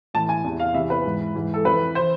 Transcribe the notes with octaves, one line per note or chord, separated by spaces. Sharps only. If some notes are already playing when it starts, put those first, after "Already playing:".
A2 E3 A5
G#5
E2 C3 E3
F5
E2 C3 E3 E5
B4
G#2 E3
G#2 E3
A4
F2 E3 B4
E3 C5